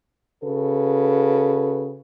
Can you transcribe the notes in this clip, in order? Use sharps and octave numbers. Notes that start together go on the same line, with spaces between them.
C#3 F#4 A4 B4